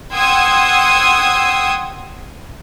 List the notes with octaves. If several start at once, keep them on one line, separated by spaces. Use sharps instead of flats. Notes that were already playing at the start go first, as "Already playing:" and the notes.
F#5 G5 C6 D#6 E6 G#6